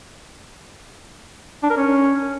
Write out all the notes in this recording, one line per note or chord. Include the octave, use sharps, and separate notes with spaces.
D4
A#4
C#4